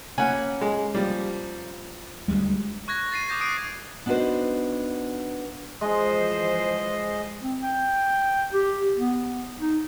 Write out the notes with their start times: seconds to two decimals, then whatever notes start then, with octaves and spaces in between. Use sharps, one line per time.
0.18 A#3 C#4 F#5 G#5 B5
0.61 G#3
0.95 F3 G3 A#3
2.28 D2 G3 G#3
2.88 C#6 F#6 G#6 A#6
3.12 A6 C7 D#7
3.29 D6 D#6 G6 A#6
3.41 D6 D#6 G#6 C7 D7 D#7
4.06 B3 D4 D#4 F#4 B4 C5
5.81 E3 F3 G#3 C5 D#5
7.43 C4
7.62 G5
8.53 G4
8.97 B3
9.60 D#4